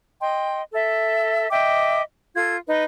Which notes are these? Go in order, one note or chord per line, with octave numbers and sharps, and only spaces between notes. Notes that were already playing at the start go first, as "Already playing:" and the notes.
D#5 G5 C6
A4 E5
D#5 E5 G5 D6
F4 A4 G#6
D#4 B4 D#5